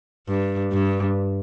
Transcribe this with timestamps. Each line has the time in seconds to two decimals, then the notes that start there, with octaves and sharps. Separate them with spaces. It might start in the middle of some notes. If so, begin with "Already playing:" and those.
0.28 G2
0.72 G2